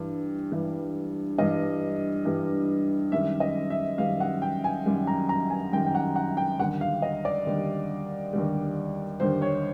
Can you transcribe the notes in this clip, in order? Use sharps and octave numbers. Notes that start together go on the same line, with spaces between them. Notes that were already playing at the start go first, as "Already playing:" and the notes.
Already playing: G2 E3 G3
G2 E3 G3
G2 E3 G3 D#5
G2 E3 G3
F#2 D#3 G3 E5
D#5
E5
F#2 D#3 G3 F5
F#5
G5
G#5
F#2 D#3 G3
A#5
A#5
G#5
F#2 D#3 G3 G5
G5
F#5
F#5
G5
D#2 D3 G3 F#5
F5
D#5
D5
D#2 D3 G3
D#2 D3 G3
D#2 D3 G3 C5
C#5